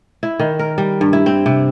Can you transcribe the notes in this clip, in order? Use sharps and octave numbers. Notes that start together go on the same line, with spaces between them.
E4
D#3
A#4
G3
G2
E4
C4
C3